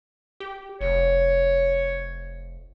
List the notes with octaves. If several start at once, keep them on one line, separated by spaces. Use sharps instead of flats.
G4
F1 C#5